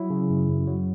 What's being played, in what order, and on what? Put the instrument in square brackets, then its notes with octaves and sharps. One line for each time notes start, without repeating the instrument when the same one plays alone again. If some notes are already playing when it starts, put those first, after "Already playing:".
Already playing: [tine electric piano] F#3 E4
C#3
F#2
F#2
F#3